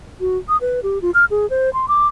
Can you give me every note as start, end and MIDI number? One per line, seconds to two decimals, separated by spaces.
0.20 0.37 66
0.49 0.57 87
0.61 0.80 71
0.83 1.01 67
1.02 1.11 65
1.14 1.25 89
1.31 1.48 68
1.50 1.70 72
1.74 1.86 84
1.88 2.07 86